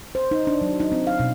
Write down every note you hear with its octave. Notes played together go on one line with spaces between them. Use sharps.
C5
D#4
D4
F#3
D#4
C4
F5
B2